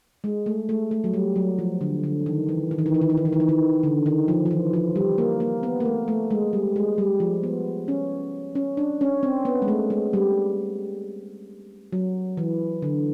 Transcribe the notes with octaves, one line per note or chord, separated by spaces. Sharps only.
G#3
A3
A3
A3
F#3
G3
F#3
F3
D3
D3
D#3
E3
D#3
E3
D#3
E3
D#3
E3
D#3
E3
D#3
E3
D#3
D3
D#3
F3
F3
E3
F3
G3
A#3
A#3
B3
A#3
A3
A3
G#3
G3
G#3
G3
F3
B3
C#4
C#4
D4
C#4
C4
B3
G#3
A3
G#3
G3
F#3
E3
D3